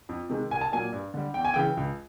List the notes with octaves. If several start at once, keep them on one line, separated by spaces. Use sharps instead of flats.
F2
C3 D#3 G#3
C2 G#5
A5
A#2 F#3 A#3 G#5
G2
D3 G3
E2 G5
G#5
C#3 E3 G5
C#2